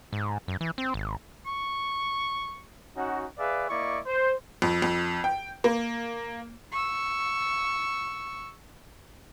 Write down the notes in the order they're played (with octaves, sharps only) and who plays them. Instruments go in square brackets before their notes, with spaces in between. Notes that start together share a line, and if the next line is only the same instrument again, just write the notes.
[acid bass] G#2
F#2
E3
C4
G#1
[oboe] C#6
[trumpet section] C#4 D#4 F#4
G#4 B4 D5 E5 F5
A#3 E4 D5 D#5 C#6
C5
[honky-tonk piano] F2
F2
G5
A#3
[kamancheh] C#6 E6